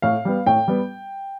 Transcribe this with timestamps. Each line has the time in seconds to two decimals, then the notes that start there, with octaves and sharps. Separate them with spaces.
0.02 A2 F5
0.25 G3 B3
0.46 A2 G5
0.68 G3 B3